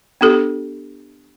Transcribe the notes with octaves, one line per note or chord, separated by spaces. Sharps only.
B3 D4 G4 A4